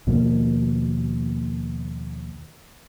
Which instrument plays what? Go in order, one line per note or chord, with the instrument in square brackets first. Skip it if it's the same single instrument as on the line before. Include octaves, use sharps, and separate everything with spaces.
[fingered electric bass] D#2 B2 F3 A#3